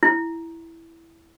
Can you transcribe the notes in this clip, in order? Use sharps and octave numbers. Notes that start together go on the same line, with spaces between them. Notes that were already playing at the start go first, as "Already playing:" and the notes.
E4